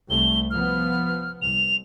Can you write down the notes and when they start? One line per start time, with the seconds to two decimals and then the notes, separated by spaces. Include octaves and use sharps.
0.10 C2 G3 A3 G7
0.50 F3 B3 F6
1.42 C2 F7